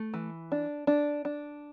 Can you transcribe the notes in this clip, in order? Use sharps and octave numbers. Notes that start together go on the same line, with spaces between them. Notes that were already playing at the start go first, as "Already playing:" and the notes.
Already playing: A3
E3
D4
D4
D4